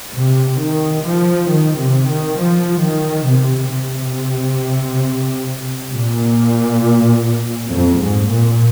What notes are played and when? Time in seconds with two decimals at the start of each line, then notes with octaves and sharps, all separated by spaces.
0.15 C3
0.60 D#3
1.04 F3
1.49 D#3
1.79 C3
2.08 D#3
2.38 F3
2.81 D#3
3.26 C3
3.70 C3
5.93 A#2
7.70 F2
7.99 G#2
8.29 A#2